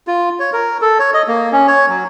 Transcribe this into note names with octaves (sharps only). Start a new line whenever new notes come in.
F4
C#5
A#4
A4
C#5
D#5
A#3
C#4
C#5
F#3